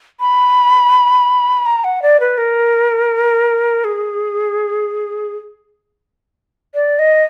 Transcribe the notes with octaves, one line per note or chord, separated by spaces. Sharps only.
B5
A#5
F#5
D5
B4
A#4
G#4
D5
D#5